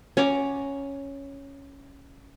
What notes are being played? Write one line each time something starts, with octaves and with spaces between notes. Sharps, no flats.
C#4 F#5 A#5 D6